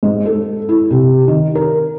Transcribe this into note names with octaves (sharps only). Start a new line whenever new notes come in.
G#2
A4
E4
C3
D#3
A#4